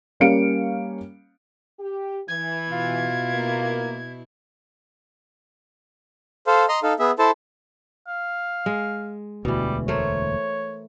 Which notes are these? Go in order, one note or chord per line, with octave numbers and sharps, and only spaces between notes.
G3 A#3 C#4 F5 C#7 D7
G4
E3 G#6
B2 E4 F4
A#3
A4 C5 F5
D#5 A#5 C6
D#4 A4 F5
B3 G#4 E5
E4 A4 C5 A5
F5
G#3
E1 D2 B2 E3 G3
A3 A#4 C5 C#5